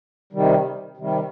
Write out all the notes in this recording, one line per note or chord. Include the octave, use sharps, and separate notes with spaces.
C3 D#3 G3
C3 D#3 G3